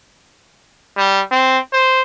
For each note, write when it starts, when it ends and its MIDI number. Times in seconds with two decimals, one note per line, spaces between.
0.97 1.22 55
1.31 1.59 60
1.73 2.02 72